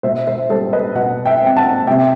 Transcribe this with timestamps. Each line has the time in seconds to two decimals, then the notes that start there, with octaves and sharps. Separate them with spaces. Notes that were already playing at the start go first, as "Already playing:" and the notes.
0.03 B2 C5 E5
0.27 C5 E5
0.49 G3 A4 C5
0.73 B4 D#5
0.95 B2 D#5 F#5
1.25 E5 G5
1.42 C4 G5
1.56 F#5 A5
1.87 C3 E5 G5